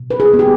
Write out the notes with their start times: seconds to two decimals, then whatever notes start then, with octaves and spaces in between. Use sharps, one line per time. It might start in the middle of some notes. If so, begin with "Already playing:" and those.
Already playing: B2
0.11 B4
0.20 G#4
0.34 B3
0.39 G4